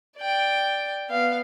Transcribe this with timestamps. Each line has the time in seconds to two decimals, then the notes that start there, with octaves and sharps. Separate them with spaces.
0.18 D5 G5
1.09 B3 F5